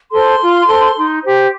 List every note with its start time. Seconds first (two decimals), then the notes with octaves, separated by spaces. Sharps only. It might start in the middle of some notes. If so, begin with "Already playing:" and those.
0.11 A4 C5 C6
0.40 F4
0.68 A4 C5
0.96 D#4
1.24 G4 C5